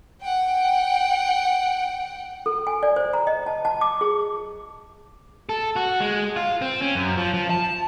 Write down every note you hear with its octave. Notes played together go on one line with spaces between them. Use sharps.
F#5 G5
A4
G#5
D5
C5
A#5
D#5
A5
A5
D6
G#4
A4
F#4
G#3
F4
C4
C#4
F#2
F3
F3
A5